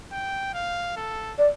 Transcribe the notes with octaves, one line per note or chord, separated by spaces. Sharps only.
G5
F5
A4
D5